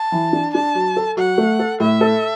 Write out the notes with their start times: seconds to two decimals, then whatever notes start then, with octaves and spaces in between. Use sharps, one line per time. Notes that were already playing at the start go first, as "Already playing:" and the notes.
Already playing: A5
0.12 E3
0.33 D4
0.54 D4 A5
0.75 F#3
0.97 A4
1.17 F#3 F#5
1.38 A3
1.59 A4
1.80 A2 E5
2.01 A4